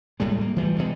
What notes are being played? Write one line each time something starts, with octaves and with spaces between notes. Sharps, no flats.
D1 A2 G3 G#3
A#3
E3 F3 G3 A3
B2 G3 G#3